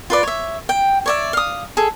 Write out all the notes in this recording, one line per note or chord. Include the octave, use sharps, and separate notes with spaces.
F4 B4 D5
C#5 E5
G5
C#5 D5 E5
F5 D#6
G#4 A4